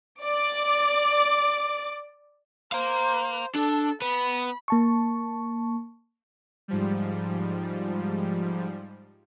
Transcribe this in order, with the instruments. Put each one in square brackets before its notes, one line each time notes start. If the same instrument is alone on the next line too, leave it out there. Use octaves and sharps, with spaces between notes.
[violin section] D5 D6
[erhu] C5 [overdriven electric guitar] F5 A#5
[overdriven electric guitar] D4 [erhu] A4
[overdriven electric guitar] B3 [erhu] B5
[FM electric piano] A#3 A5 C#6
[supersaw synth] G#2 F3 G3